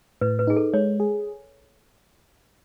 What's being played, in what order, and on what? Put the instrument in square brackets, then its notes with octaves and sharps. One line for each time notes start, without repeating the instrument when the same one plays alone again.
[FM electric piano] A2 [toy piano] B4
[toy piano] B4
[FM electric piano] D#4 [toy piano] G#4
[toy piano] A4
[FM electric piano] G#3 [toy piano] C#5
[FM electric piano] G#4